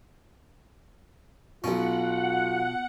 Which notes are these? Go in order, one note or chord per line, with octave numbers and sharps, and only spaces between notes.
B1 B2 C#4 F4 F#5